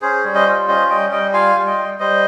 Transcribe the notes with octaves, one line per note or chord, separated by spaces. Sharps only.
C#4 G#4 C5
G3
C5 D#5
F4
C#4 C5 D#5
G3 D#5 G5
G3 D#5 G5
F4 F5 G#5
G3
D#5 G5
G3
G3 C5 D#5